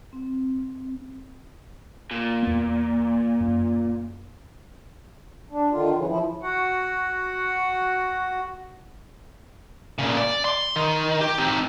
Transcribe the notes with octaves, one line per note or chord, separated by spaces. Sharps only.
C4
A#2
E2 B3
F#2
D4
D3 D#3 F4
F#2 C#3 E3
F3 E4
F#4 F#5
A#2 C#3
D5
C6
D#3
G4
C4 D#4